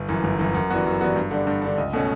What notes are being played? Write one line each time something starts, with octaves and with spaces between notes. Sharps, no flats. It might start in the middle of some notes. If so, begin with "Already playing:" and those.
Already playing: G1
F#2 E3
G1
F#2 E3
F#2
E3 G3 B3 F#4
F#2
E3 G3 B3 F#4
G2
D3 G3 D4
G2
D3 G3 D4
C#2
B2 A3 C#4